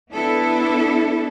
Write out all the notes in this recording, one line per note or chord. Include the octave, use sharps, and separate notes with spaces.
B3 D4 E4 A4 B4